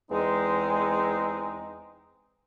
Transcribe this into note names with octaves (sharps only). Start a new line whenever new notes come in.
E2 G#3 C4 D#4